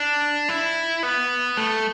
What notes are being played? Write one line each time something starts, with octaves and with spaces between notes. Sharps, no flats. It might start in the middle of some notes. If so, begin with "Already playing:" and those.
Already playing: D4
E4
B3
A3